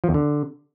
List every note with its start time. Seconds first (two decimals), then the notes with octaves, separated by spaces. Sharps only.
0.04 F3
0.09 E2
0.14 D3